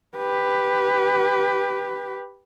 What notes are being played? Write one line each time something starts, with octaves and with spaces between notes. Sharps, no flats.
G4 B4